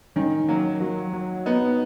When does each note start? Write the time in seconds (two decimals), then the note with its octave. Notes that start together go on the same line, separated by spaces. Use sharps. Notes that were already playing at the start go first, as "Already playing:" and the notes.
0.16 D#3 C#4
0.48 F#3 A#3
0.81 F#3
1.13 F#3
1.46 B3 D#4